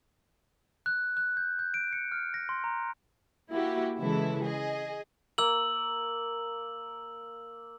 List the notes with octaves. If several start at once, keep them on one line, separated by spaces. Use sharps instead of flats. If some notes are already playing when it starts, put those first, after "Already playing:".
F#6
F#6
G6
G6
D7
C#7
F6
A#6
C6
A#5
A#3 E4 F#4 G4
C#3 E3 G#3 E4 A4
G#4 D#5
A#3 E6 F#7